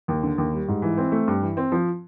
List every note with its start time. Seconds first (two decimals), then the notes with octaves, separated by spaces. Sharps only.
0.08 D#2
0.23 D3
0.38 D#2
0.53 G3
0.68 G#2
0.82 E3
0.98 C4
1.12 A3
1.28 G2
1.42 E3
1.57 C4
1.72 F3